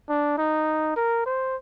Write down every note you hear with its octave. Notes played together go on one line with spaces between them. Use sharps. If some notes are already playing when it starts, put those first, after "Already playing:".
D4
D#4
A#4
C5